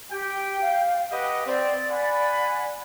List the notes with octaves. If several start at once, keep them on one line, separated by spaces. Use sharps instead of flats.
G4 G5
F5
G4 B4 D#5 F#5
C4 D5
F#5 G#5 B5